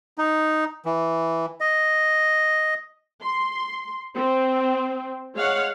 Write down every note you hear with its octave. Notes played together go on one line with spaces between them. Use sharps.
D#4
E3
D#5
C6
C4
G#3 C#5 F5 F#5